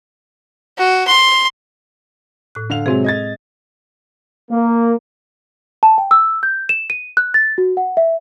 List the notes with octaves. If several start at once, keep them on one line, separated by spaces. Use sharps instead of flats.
F#4
C6
A2 F#6
D3 F5 F7
C3 F#3 G#3 C4 G#4
D#5 G#6 A6
A#3
A5
G5
E6
G6
E7
D#7
F#6
A6
F#4
F#5
E5